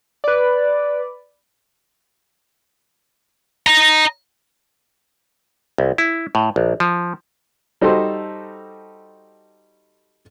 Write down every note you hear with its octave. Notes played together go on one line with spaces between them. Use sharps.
B4 D5
D#5 A#5
C2
E4
A2
A#1
F3
G3 D#4 F#4 A4 C5